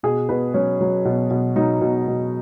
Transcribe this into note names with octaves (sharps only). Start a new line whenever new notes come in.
B2 G#4
B2 B4
F#3 C#4
F#3
B2
B2
F#3 D#4
B2
B2